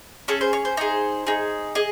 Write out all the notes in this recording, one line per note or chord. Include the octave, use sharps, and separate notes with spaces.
C#4 G#4 A4
C5
C#5
C5
D#4 G#4 C5
D#4 G#4
G#4 D#5